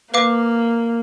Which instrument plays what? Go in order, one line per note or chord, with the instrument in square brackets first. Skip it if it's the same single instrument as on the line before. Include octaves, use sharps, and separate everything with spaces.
[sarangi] A#3 [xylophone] B4 F5 D6